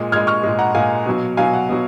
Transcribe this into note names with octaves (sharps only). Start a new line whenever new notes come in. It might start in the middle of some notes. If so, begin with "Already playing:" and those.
Already playing: A#2 G#3
A#2 G#3 F6 G#6
C#6 F6
A#2 G#3
F#5 A#5
A#2 G#3 F5 G#5
B2 F#3
B2 F#3 F5 G#5
F#5
B2 F#3